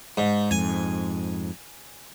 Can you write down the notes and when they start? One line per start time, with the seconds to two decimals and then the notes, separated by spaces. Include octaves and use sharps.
0.17 G#2
0.51 F2 G#2 G#5